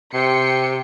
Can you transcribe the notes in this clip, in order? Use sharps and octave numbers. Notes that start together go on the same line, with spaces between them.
C3 G5 C6 C#7